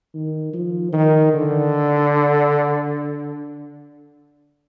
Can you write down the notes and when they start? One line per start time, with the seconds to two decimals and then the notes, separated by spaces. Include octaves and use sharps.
0.14 D#3
0.53 F3
0.93 D#3
1.33 D3